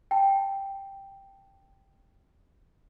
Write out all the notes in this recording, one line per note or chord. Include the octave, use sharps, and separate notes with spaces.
G5 A5